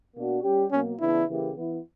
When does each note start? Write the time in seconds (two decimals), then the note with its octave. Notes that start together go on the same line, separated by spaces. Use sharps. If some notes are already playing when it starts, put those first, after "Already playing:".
0.15 B2 A#3 D4 F#4
0.43 G3 C#4 G4
0.71 B2 F#3 A#3 C#4
1.00 C#3 E3 B3 D4 E4
1.27 C#3 E3 A#3 E4 G4
1.55 E3 B3 E4